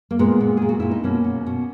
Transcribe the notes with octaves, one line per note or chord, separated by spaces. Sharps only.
A#3
A#2 G#3 B3
A#2
A#2 G#4
F#4
A#2 E4
D#4
B2 A#3 C#4
B2
B2